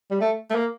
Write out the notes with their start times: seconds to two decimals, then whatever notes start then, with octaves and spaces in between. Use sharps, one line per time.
0.11 G3
0.21 A3
0.50 A3
0.55 A#3